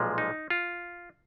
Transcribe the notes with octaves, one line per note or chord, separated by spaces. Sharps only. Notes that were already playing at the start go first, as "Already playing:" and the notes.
Already playing: B1 A#2 F3 G#3
D#4
F4